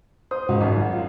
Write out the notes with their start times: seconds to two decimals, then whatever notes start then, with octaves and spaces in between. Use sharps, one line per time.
0.31 C5 D#6
0.49 C#2 G#2 F#4
0.61 G#1 F#2
0.93 F4